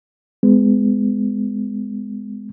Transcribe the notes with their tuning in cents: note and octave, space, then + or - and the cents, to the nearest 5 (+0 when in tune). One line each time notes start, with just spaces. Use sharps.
G#3 +0 B3 +35